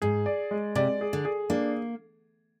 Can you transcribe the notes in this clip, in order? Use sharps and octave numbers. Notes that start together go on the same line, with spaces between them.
G#2 G#4
D5
G#3
C3 D5
G#4
D3
G#4
A#3 D4